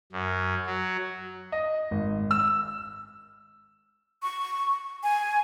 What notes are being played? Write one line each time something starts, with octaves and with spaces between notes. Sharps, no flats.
F#2
F#3
D#5
G#1
E6
C#6
G#5